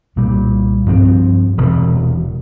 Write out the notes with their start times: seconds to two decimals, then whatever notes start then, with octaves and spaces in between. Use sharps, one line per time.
0.16 C2 A#2 G3
0.86 G2 F3 C4
1.58 E1 E2 C3